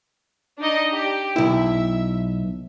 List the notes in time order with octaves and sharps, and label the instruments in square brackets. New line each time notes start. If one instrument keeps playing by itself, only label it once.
[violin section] D4 D#4 D#5
G4
[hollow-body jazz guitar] B1 E4 [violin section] E5